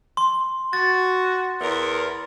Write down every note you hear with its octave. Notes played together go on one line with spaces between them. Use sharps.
C6
F#4 A6
E2 A#4